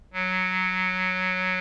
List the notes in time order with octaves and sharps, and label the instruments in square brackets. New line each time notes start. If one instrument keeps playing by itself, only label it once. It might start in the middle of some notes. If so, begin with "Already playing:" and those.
[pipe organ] F#3